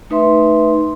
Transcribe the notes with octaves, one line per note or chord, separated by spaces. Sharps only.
A3 D#4 B4 E5 C6